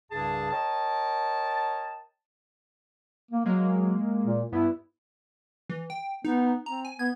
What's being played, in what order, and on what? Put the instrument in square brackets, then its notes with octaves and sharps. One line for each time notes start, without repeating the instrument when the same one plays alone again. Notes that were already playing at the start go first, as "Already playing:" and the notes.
[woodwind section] C2 G2 C#3 G#4 A5
A#4 C#5 D#5 G5 A5
[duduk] A#3
[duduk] F#3 [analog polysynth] G#3 A#3
[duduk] A#2
[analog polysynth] G2 B3 [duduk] E4
[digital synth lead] E3
G5
[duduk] B3 [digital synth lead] D#4
[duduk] C4 [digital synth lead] A#5
[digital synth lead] G#5
[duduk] B3 [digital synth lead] G#6